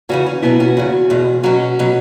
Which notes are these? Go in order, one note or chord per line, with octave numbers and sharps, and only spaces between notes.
E2 C#3 E3 C#4 F#4
C#4
B2 F#3 B3 E4
C#4 F#4
E2 C#3 F#3
E2 B2 G#3
B2 F#3 C#4 F#4
B2 F#3